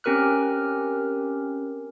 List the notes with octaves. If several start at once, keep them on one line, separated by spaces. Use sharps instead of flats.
C4 C#4 G4 A#4 F6 F#6